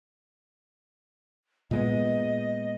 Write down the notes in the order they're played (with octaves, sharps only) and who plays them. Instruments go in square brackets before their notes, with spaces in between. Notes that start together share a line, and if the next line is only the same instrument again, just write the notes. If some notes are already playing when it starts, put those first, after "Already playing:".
[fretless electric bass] A#2 G#3 B3 [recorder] D#5